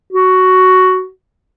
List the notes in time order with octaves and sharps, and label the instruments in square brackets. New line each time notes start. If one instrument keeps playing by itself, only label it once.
[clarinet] F#4